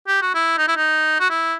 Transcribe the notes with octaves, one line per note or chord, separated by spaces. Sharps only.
G4
F#4
E4
D#4
E4
D#4
F#4
E4